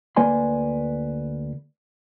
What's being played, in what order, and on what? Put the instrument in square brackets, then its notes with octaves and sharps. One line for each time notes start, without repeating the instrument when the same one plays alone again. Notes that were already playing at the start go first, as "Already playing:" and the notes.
[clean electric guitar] D2 A#3 B4 D5 G#5 C6